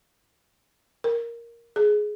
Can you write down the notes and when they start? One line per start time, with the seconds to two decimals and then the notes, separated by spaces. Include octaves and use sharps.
1.04 A#4
1.76 G#4